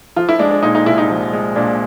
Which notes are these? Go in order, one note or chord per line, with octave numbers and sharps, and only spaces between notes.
F3 F4
E4
G#3 D4
D4
A#2 D#4
D#4
C2 E4
D#4
F3
G#3
A#2 D4